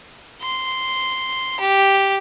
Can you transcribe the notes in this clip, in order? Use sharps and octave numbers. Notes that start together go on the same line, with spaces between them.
C6
G4